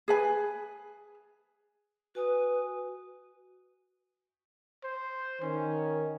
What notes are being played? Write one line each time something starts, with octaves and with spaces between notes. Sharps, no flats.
G#4 B4 G#5
F#4 B4 G#5 D#6
C5
D#3 C#4